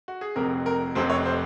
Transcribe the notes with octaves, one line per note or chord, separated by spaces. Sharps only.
F#4
G#4
F1 F2 C3 A#4
A#4
F1 F2 C3 C5
C#5
C5